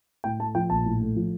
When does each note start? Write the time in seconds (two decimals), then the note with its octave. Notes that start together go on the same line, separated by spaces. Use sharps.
0.24 A2 G5
0.39 A3 A5
0.55 F3 G5
0.70 A#1 A5
0.86 A2
1.01 A3
1.16 F3